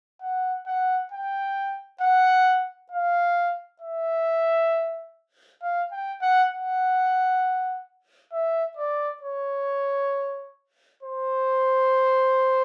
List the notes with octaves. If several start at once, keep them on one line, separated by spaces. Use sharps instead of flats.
F#5
F#5
G5
F#5
F5
E5
F5
G5
F#5
F#5
E5
D5
C#5
C5